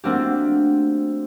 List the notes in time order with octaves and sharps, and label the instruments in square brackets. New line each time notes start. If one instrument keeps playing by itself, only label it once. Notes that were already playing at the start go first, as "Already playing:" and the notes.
[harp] A3 A#3 C4 D4 F#4 G4